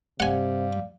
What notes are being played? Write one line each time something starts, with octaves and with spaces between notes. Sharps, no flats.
G2 C3 D5 F5 F#5 G#5